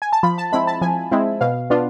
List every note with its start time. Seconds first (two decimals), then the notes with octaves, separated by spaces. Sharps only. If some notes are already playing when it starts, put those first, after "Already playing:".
0.02 G#5
0.13 A5
0.23 F3 B5
0.38 A5
0.52 G#3 C4 E4 B5
0.67 A5
0.81 F3 G#5
1.12 G#3 C4 E4
1.41 B2 F5
1.70 B3 D4 F4